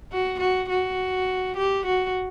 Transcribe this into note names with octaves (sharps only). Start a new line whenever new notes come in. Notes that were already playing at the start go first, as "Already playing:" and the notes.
F#4
F#4
F#4
G4
F#4